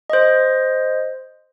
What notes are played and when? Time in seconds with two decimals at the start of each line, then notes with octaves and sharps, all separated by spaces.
0.10 C5 D#5